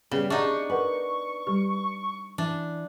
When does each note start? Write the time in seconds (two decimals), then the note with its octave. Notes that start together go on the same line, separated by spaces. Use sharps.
0.11 C#3 G3 B3
0.30 D4 D#4 G4 D5 E5 F#5 C#6
0.70 A#4 B4 F#5 G#5
1.47 G3 G4
2.38 E3 D4